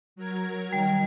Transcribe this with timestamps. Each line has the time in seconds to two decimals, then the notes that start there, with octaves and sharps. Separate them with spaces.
0.16 F#3 A#4 G#6
0.73 D#3 G3